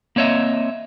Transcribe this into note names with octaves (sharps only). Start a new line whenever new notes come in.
A#3 C4 C#5 D#5 E5